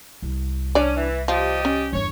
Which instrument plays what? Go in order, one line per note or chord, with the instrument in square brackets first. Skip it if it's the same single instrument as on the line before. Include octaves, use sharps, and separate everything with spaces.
[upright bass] C2
[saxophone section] C#4 [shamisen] D4 D5
[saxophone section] E3
[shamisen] F3 [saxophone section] G3 G4 D#5
[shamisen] C#4
[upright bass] G1 E2 [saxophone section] C#5